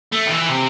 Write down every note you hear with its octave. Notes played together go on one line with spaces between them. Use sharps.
A3
D#3
E3
C3